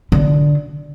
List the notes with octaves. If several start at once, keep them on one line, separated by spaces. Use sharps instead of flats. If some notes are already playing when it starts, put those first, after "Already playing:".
D3